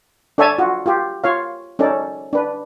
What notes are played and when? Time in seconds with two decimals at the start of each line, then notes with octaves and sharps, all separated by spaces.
0.38 D4 A4 C#5 E5 G#5 A5
0.58 F4 F#4
0.86 F4 G4
1.24 F4 C#5 F5
1.79 C#4 D#4 A4 D5
2.33 D4 B4